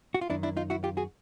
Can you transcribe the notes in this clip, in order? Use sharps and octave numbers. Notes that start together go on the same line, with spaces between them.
F#4
F4
F#2 D#3 D4 E4
D4 E4
D#4 F4
E4 F#4
F4 G4
F#4 G#4